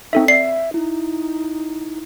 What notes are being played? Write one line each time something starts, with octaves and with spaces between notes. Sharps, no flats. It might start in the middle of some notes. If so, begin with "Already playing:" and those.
C4 D#4 A4 E5
D5 E5 C7
D#4 E4